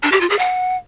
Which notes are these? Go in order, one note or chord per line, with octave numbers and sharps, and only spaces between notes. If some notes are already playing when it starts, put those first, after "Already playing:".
D4
G4
F4
G#4
F#5